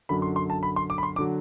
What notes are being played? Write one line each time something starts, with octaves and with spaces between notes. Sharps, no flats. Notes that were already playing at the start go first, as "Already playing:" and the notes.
F#2 D3 F#3 B5
C6
C6
A5
B5
C6
D6
B5
C6
D3 F#3 D6